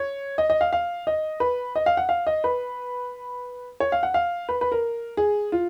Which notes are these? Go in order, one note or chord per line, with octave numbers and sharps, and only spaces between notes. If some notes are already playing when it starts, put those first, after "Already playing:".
Already playing: C#5
D#5
D#5
F5
F5
D#5
B4
D#5
F5
F#5
F5
D#5
B4
C#5
F5
F#5
F5
B4
B4
A#4
G#4
F4